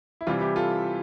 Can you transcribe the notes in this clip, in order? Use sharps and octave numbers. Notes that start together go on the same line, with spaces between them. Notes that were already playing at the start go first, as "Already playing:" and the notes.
E4
C3 E3 G3 F4
E4 G4
F4 A4